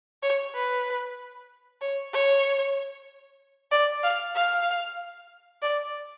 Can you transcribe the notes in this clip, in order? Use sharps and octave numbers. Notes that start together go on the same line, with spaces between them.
C#5
B4
C#5
C#5
D5
F5
F5
D5